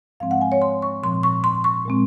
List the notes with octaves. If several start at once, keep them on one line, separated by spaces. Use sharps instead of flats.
G#2 F3 G#3 C4 F5
F#5
G#5
C#5
C6
C#6
A#2 F3 C4 C6
C#6
C6
C#6
A#2 G#3 C4